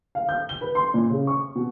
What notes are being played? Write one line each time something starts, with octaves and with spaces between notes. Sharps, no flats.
F5
G6
G7
B4
C6
A#2
C#3
C#6
B2